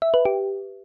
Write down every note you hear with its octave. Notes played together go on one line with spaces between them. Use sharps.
E5
B4
G4